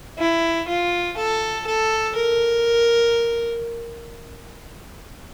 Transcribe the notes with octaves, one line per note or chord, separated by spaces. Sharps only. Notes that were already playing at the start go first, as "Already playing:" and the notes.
E4
F4
A4
A4
A#4